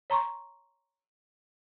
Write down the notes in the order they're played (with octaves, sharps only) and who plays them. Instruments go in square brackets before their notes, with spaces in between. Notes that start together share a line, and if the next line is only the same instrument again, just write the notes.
[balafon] C#5 A#5 C6 C#6